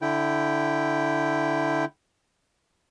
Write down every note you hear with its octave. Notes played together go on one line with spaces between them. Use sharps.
D3 E4 G5